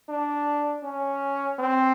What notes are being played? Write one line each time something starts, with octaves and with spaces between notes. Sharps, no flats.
D4
C#4
C4